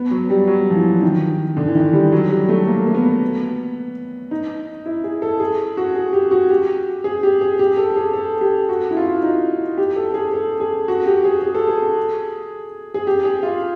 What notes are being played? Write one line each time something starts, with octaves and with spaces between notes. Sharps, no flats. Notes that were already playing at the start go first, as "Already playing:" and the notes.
Already playing: B3
F#3
G3
F#3
F3
E3
D#3
D3
E3
D#3
G3
F#3
G3
A3
A#3
A#3
B3
D#4
E4
G#4
A4
G#4
F#4
G#4
G4
F#4
G4
G#4
G4
G#4
G4
A4
G#4
A4
G4
F#4
E4
F4
D#4
G4
A4
G#4
A4
G#4
F#4
G4
G#4
G#4
A4
G#4
G#4
G4
G#4
F4